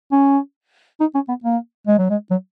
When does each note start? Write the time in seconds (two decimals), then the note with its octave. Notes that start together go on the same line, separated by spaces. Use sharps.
0.12 C#4
1.00 D#4
1.15 C#4
1.29 B3
1.44 A#3
1.87 G#3
1.98 F#3
2.10 G#3
2.31 F#3